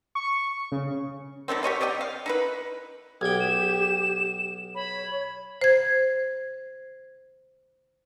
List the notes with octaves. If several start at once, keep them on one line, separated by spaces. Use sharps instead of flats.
C#6
C#3
D#3 G3 A3 C4
G4 C#5 D#5 F5
C3 D5 D#5 G5
F5
D#4 E4 B4
B1 G4 G5 G#6
E7
C#5 B5
C5 G#6